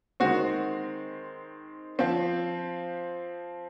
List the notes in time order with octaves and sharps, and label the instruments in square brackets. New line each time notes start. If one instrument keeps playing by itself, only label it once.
[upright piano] D#3 G#3 C4 F#4
F3 C4